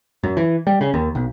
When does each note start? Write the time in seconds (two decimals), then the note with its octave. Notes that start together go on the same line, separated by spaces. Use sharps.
0.23 F#2
0.37 E3
0.67 G3
0.81 C#3
0.94 D#2
1.15 B1